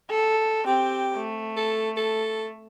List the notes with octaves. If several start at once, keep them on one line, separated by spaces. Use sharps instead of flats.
A4
C4 G4
A3
A4
A4